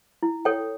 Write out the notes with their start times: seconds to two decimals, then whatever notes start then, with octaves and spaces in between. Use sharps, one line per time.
0.23 E4
0.45 A4 C#5 G5